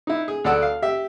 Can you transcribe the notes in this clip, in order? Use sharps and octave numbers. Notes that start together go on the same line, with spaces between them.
D#4 E4
G#4
D2 A4 D5 F#5 E6
F5
G4 E5